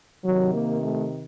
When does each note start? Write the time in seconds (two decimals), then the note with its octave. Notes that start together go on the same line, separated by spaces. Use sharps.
0.24 C3 D#3 F#3
0.53 A#3
0.82 A3